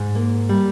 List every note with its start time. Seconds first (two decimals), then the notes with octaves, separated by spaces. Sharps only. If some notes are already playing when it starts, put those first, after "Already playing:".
Already playing: G#2
0.15 A#3
0.49 G3